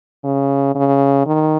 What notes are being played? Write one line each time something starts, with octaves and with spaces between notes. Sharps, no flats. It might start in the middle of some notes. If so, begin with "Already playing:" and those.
C#3
C#3
D#3